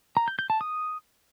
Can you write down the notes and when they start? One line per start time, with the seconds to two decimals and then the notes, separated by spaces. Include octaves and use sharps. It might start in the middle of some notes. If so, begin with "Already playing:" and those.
0.17 A#5
0.28 G6
0.39 G6
0.50 A5
0.61 D#6